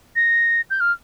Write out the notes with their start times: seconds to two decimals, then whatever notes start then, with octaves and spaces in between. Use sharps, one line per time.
0.16 A#6
0.70 G6
0.80 F6